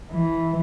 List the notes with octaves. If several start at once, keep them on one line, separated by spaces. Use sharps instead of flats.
E3